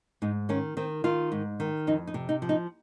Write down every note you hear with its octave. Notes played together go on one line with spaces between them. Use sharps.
G#2 D#4
D#3 C#4
D#3 C4
D#3 F4
G#2
D#3
F2 D#4
D#4
C3
D#4
F3
D#4